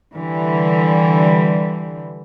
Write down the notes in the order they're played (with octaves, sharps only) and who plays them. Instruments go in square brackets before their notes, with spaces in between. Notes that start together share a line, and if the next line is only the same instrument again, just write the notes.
[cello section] D3 E3 G3